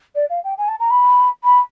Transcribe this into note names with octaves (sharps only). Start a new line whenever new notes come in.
D5
F5
G5
G#5
A5
A#5
B5
B5